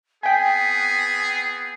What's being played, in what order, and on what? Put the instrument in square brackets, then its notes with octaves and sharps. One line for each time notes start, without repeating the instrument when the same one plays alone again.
[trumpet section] B3 C4 G#4 [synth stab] G5 G#5 [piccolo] B6